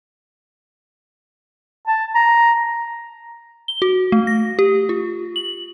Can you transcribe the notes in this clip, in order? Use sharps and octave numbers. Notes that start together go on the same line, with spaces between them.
A5
A#5
G7
F#4
A3
A#6
G4
F4
F#7